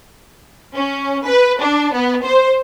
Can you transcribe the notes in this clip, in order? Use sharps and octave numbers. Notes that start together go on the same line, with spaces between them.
C#4
B4
D4
B3
C5